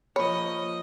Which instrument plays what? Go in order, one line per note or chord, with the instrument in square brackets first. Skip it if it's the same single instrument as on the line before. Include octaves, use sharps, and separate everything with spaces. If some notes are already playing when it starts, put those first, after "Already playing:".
[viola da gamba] F3 A#3 D#5 [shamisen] C#5 [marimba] B5